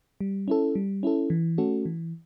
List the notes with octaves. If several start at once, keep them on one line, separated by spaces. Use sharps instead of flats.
G3
C#4 E4 A4
G3
C#4 E4 A4
E3
A3 C#4 F#4 A4
E3